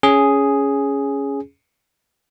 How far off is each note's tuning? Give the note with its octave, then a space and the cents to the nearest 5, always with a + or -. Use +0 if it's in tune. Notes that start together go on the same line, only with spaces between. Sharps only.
C#4 +5 G#4 +0